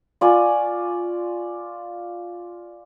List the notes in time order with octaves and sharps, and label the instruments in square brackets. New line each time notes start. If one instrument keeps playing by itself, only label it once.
[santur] F4 D5 G#5 C#6